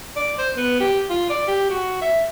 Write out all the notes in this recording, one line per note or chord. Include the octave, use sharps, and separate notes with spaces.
D5
C5
B3
G4
F4
D5
G4
F#4
E5